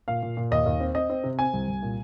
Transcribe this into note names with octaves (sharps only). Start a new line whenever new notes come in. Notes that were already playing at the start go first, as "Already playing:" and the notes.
A#2 F5
A#2
A#2
D#2 D#5
D#2
C4
C4 D#5
C4
C3
C4 G#5
C2
C2
A#2